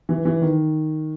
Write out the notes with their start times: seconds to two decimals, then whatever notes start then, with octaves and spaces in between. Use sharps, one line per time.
0.09 E3
0.25 E3
0.42 D#3